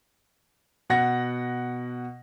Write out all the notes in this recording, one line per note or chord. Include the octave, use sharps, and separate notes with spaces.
B2 F#5 A#6